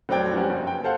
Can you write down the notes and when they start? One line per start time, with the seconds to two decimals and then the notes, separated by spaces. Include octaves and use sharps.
0.09 F1 F#3 C4 D5 G5 G#6
0.33 F3 G3 B3 C#4 F#4 G4
0.49 F#1
0.67 G5
0.84 A4 C5 F5 F#5